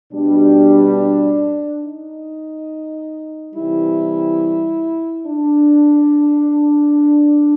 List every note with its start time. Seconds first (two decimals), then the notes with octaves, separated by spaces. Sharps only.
0.13 B2 G3 D4
1.84 D#4
3.55 C3 E3 G3 E4
5.26 D4